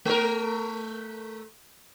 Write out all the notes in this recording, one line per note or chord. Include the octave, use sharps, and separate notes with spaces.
A3 A#4